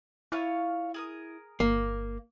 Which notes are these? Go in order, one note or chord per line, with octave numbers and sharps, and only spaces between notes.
E4 F4 C#5 F5
G#4 A#4 D#6
G1 A#3